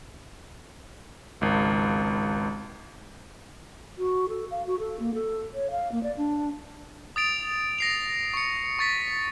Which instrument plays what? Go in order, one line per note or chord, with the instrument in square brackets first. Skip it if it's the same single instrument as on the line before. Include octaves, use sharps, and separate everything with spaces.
[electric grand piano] G#1 C#2
[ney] F#4
A4
F5
F#4
A4
A#3
A4
C#5
F5
A#3
D5
D4
[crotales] D#6 A6 D7 F7
A#6 C7 F7
C#6 C#7
C#6 A6 B6